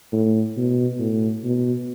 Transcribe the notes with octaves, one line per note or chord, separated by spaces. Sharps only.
A2
B2
A2
B2